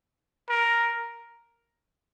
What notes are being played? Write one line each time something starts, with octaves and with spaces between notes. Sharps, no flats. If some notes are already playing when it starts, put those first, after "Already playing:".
A#4